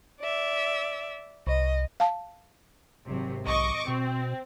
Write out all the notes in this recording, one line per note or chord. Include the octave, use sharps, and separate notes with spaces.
D5 E5
C2 D#5
F5 A5
G#1 C3 F#3
B1 D#5 C#6 D6
B2 C4